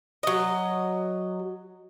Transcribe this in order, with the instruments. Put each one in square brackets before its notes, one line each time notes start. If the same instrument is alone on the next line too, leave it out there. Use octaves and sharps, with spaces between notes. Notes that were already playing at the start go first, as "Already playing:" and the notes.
[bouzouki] F#3 D#5